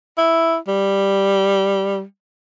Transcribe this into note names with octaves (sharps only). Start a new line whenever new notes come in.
E4
G3